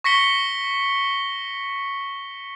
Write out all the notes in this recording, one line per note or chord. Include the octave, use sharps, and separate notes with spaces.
C#6 A#6 B6 C#7 G7